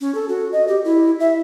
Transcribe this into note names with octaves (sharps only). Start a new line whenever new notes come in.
C#4
A4
F#4
D#5
G4
E4
E5